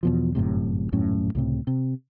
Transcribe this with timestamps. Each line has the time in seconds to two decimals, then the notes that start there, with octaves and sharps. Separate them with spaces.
0.03 E2 B2 F3
0.35 G1 F#2 A2 C3
0.92 D#1 F#2 A2 C#4
1.35 C#2 A2 C3
1.67 C3